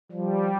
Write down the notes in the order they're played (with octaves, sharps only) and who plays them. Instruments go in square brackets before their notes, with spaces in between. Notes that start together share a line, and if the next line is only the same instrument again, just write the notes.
[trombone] F3 [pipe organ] G3